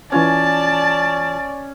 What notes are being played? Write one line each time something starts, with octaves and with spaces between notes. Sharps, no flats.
E3 C#4 F4 D5 G#5 A5